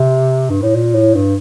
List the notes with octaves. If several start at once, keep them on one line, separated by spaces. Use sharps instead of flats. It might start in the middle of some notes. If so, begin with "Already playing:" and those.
Already playing: C3
G2
A2
A#2
A2
G2